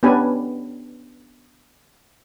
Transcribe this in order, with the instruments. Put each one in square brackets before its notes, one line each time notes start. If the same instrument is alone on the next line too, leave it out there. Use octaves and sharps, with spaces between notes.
[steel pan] B3 C#4 D4 G4 B4 G#5